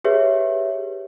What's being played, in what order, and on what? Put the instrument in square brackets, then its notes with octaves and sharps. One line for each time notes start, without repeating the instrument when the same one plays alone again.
[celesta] G4 G#4 B4 C#5 E5